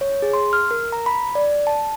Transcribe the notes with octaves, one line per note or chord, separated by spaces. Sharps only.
C#5
G#4
C6
F6
A#4
A#5
B5
D5
A5